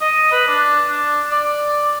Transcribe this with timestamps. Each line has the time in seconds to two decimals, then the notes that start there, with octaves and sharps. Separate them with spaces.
0.01 D#5
0.32 B4
0.47 D4
0.89 D4
1.31 D5